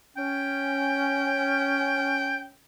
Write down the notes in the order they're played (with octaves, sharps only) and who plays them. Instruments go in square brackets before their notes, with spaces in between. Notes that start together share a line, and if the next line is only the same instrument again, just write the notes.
[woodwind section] C#4 [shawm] G5